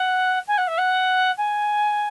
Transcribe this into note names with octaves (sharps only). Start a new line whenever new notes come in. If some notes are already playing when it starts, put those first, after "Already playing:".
Already playing: F#5
G#5
F#5
E5
F#5
G#5